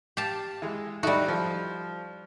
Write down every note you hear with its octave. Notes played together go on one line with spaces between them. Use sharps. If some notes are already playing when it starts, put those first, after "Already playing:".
G4 F5 A5
E3 G#3
G3 A3 D#4 E4 F#4
F3